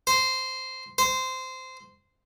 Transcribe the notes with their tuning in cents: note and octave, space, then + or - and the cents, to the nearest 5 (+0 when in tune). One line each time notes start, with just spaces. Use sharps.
C5 -10
C5 -15